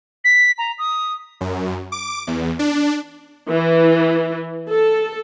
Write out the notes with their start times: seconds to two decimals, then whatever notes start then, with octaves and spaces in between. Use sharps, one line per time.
0.24 B6
0.58 A#5
0.78 D#6
1.41 F#2
1.92 D6
2.27 E2
2.59 D4
3.49 E3
4.69 A4